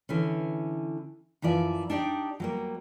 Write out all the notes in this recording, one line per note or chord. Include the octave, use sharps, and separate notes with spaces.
D3 E3 C#4
F#2 E3 F3 D5 G#5
D4 D#4 G4 D5
F#3 G3 A#3